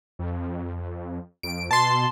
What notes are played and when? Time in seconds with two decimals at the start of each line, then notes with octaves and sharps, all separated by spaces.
0.19 F2
1.43 F2 D7
1.71 B2 A5 C6